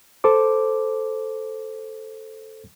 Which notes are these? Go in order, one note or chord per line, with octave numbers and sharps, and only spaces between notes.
A4 C5 D6